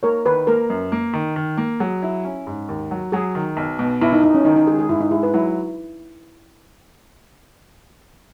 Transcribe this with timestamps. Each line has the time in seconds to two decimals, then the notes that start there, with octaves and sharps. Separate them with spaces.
0.03 A#3 A#4 C#5
0.25 D#3 B4
0.47 A#3 A#4
0.70 F#2
0.92 A#3
1.13 D#3
1.36 D#3
1.57 A#3
1.80 F#3 G#4
2.03 E4
2.25 C#4
2.47 G#2
2.68 D#2
2.91 F#3
3.12 F#3 G#4
3.35 D#3
3.57 B1
3.79 B2
4.01 B1 E4
4.13 D#4
4.23 B1 D#4
4.35 C#4
4.45 D#3 D#4
4.56 D#4
4.67 G#3 G#4
4.79 G#4
4.89 G#2 E4
5.01 D#4
5.11 G#3 E4
5.23 B4
5.34 F#3 E4